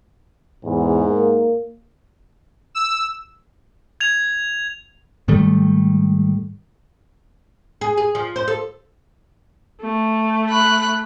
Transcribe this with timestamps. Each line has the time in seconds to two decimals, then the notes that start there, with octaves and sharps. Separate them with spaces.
0.64 E2 G#2
1.08 A#3
2.75 E6
4.00 G#6 F7
5.28 G#2 D#3 G3 A3
7.81 G#4
7.97 G#4
8.15 F3
8.36 C5
8.48 A4
9.81 A3
10.50 B5 F#6